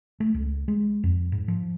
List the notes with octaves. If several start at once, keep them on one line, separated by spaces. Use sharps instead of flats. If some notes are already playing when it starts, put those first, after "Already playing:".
A3
C#2
G#3
F2
G#2
F3